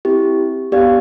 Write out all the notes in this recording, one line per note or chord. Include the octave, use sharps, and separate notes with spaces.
C4 E4 G4
B3 D4 G4 D5 F5